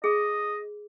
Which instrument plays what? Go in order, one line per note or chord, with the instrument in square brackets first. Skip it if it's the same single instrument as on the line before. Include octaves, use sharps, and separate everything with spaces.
[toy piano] G#4 [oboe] D#5